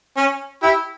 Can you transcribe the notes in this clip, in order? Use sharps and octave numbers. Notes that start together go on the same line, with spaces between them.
C#4
E4 G4